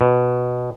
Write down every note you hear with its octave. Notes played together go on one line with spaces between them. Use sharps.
B2